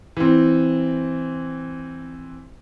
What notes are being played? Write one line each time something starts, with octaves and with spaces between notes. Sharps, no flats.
E3 C4